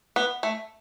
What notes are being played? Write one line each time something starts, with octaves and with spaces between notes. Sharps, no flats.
B3
A3